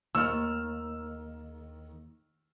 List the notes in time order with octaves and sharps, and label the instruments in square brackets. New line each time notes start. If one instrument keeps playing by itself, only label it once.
[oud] D#2 [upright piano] E6 F6